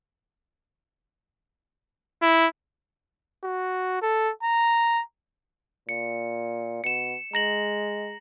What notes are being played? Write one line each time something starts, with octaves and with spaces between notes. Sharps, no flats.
E4
F#4
A4
A#5
A#2 C#7
B2 C#7 E7
G#3 A#5 A#6 F#7